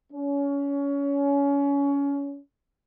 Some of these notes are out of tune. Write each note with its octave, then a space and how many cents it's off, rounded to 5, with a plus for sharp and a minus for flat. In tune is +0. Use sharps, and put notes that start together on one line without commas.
C#4 +25